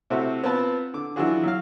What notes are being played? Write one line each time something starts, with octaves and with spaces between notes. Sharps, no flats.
C3 A3 C4 E4 F#4 C5
B3 C4 F4 B4 A5
D3 D6
E3 F#3 D4 F4 F#4 G#4
F#3 F5